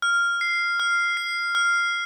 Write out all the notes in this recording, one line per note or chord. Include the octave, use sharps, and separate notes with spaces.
F6
C7
F6
C7
F6